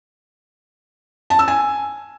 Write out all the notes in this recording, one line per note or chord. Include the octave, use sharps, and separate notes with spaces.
A5
E6
G#5